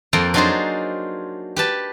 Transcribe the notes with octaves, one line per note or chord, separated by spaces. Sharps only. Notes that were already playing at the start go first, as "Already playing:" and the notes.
F2 A#3 A4 A#4 G5 G#5
F#3 D4 D#4 F4 G#4 C5
G4 B4 A5